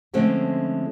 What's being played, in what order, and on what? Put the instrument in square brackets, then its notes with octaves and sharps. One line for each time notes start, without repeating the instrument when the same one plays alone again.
[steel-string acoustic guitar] D3 F3 G#3 A3 C4 C#4